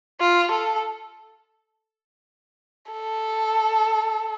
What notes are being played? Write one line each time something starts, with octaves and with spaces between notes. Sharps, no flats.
F4
A4
A4